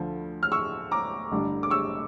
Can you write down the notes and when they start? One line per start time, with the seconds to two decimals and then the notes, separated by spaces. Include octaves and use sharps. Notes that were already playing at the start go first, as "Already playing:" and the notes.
Already playing: D2 D3 F3
0.43 F6
0.52 C#6 E6
0.91 A#5 D6
1.32 A1 G2 D3 G3
1.63 D6
1.70 C#6 E6